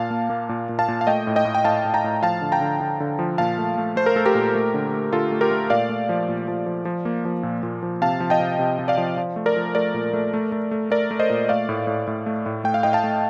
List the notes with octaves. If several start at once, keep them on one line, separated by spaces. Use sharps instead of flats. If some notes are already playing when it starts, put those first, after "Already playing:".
Already playing: A#2 F5 A5
A#3
A#3
A#2
A#2
F5 A5
A#2
F5
A3 D#5 G5
A2
D#5 G5
A2
G5
A2 F5 A5
A2
G5 A#5
A2
F3 F5 A5
D3
G5 A#5
D3
D3
D3
F3
A#2 F5 A5
A3
A3
A3 C5
A#4
A3 A4
G4 A#4
A#2
A3
D3
A3
D3 F4 A4
A3
G4 A#4
A3
A#2 D5 F5
A3
F3
A#2
F3
F3
F3
A#3
F3
A#2
A#2
F3
C3 F5 A5
F3
D#5 G5
C3
C3
C3
D5 F5
F3
F3
A3
A#4 D5
F3
A3 A#4 D5
A#2
A3
A3
A3
A3
A3 A#4 D5
A3
C5 D#5
A#2
A3 D5 F5
A2
A2
A2
A3
A2
A3 G5
F5
A2 D#5 G5
F5 A5
A3